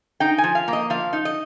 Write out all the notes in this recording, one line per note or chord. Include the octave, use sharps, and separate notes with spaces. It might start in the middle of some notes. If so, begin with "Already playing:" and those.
D#4 G5
G#5
F3
F5
A#3
D#5
F3 F5
D#4
D#5